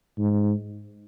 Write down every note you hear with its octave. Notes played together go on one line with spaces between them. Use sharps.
G#2